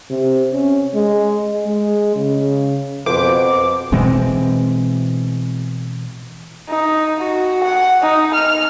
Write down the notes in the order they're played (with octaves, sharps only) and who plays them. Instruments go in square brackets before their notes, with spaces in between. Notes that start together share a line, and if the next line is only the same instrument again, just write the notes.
[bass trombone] C3
C#4
G#3
G#3
C#3
[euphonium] F2 [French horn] B2 [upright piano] B4 C5 [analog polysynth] D6
[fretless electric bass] B2 E3 G#3 C4
[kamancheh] D#4
F#4
F#5
D#4
F6